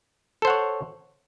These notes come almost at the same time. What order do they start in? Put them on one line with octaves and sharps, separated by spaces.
A4 C5 F#5 C#5